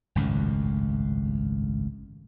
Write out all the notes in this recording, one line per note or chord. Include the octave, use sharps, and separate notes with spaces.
G#1 C#2 F#2 A2